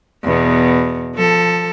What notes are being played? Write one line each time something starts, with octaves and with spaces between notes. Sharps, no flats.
E2 B2
F3 A4